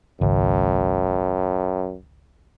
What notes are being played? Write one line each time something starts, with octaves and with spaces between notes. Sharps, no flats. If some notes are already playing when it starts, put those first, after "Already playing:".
G#1 C#2 F#2